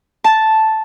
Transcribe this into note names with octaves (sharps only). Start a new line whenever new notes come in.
A5